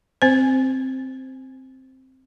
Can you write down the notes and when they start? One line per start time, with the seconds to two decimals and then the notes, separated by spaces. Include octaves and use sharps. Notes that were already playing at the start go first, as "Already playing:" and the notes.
0.22 C4 C5